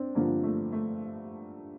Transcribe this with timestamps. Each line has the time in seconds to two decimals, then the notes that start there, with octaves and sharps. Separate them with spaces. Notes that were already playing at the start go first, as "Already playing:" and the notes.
Already playing: C4 D4
0.15 G2 D3 F3 A#3
0.43 A3
0.72 A3